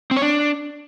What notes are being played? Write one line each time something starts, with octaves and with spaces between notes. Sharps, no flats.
C4
C#5
D4